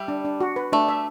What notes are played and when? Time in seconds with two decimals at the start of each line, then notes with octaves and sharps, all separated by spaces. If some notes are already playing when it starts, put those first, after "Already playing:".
Already playing: G3 E5
0.08 D4
0.25 D4
0.40 F#4
0.56 B4
0.72 A3 D4
0.88 E5